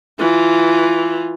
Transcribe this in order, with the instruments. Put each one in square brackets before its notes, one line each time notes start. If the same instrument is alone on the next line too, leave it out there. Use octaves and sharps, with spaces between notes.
[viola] E3 F4